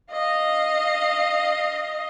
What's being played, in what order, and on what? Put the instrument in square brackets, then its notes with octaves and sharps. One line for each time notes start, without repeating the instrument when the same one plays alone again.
[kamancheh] D#5 F5